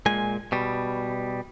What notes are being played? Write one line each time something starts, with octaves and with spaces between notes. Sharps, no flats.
A#2 G#3 G#5
B2 G3